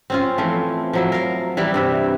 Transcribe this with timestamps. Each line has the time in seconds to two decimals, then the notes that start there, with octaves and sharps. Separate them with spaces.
0.10 C4 C#4 F4
0.38 E3 F3 A3
0.93 F3 F#3 E4
1.12 A#4 F5
1.57 E3 G3 E4 D5
1.74 G2 C3 E5